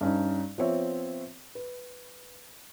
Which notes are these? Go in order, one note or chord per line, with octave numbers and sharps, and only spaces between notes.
G2 C#4 D#4
F3 B3 C4 C#5 E5
B4